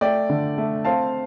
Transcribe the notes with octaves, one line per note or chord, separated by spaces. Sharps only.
A3 D5 G5
D3
A3
C4 F5 A5